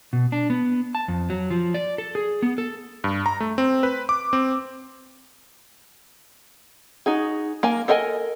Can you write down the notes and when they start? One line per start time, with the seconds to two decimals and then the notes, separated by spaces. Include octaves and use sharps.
0.13 B2
0.32 D4
0.50 B3
0.95 A5
1.08 F2
1.30 F#3
1.50 F3
1.74 D5
1.98 A4
2.15 G#4
2.43 B3
2.58 A4
3.04 G2
3.26 A#5
3.40 A3
3.58 C4
3.83 B4
4.09 D6
4.33 C4
7.06 D#4 F#4 G#4
7.63 A#3 A#4 G#5
7.88 A4 A#4 D#5 G5 G#5